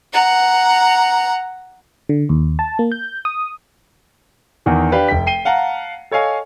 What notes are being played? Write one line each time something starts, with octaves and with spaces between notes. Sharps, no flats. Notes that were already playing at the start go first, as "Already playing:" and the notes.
F#5 A#5
D3
D#2
A5
A#3
G6
D#6
E2 D#3 E3
D4 G4 B4 F5
F1 G5 B6
G5 C7 D#7 G7
F5 F#5 A5 A#5
A4 C#5 D#5 F5 G#5